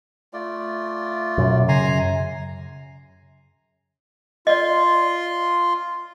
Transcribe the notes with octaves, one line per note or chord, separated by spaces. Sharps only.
A3 F4 D5
F#2 B2
C#3 G#5 A#5 C6
F4 D5 D#5 C6